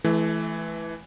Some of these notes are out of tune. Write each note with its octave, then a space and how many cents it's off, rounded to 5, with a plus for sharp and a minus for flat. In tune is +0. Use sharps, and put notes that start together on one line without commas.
E3 +0 A3 -35